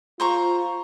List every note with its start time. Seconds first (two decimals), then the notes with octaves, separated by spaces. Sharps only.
0.20 F4 C5 A#5 C#6